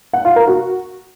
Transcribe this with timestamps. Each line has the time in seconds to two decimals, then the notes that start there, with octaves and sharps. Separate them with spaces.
0.13 F#5
0.25 F4
0.36 A#4
0.47 F#4